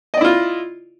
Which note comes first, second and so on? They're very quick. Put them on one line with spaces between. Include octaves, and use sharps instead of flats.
D#5 D5 E4 F4